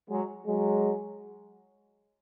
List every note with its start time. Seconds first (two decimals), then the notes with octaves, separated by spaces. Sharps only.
0.09 F#3 G#3
0.46 F#3 G#3